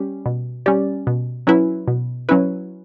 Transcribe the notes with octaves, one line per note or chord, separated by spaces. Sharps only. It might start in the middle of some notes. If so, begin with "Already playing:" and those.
Already playing: G3 C#4 G4
B2
G3 C#4 G4 D5
B2
F#3 C#4 E4 B4
B2
F#3 C#4 E4 B4